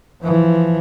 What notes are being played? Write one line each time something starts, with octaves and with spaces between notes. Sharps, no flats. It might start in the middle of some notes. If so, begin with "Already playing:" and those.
E3 F3